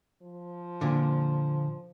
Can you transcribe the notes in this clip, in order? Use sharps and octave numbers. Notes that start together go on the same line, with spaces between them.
F3
A#2 D3